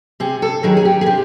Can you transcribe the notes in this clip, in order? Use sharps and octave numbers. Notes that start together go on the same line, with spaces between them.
C3 G#4
A4
D#3 F#3 G#4
G#4
G4
G#4
C3 G4